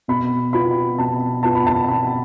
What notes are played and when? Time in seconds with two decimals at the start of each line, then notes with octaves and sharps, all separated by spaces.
0.08 B2 B5
0.53 B3 F4 B5
0.98 B2 A5
1.43 B3 F4 A5
1.55 B5
1.67 A5
1.88 B2 B5